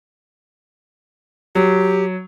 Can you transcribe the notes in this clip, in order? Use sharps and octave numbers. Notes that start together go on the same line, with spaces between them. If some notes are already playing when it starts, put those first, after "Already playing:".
F#3 G4